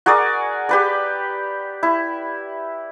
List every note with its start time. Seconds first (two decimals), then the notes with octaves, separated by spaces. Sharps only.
0.06 F#4 G#4 A#4 D5
0.69 G4 B4 D5
1.83 E4